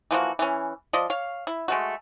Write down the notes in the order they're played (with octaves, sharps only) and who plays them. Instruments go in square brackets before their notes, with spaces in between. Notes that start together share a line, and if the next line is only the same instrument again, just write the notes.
[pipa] E3 F3 A#3 F#4
E3 C#4
F3 D5 D#5
C#5 F5
E4
G#3 A3 F#4